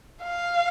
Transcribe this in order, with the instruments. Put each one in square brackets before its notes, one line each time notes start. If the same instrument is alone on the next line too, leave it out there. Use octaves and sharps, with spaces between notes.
[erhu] F5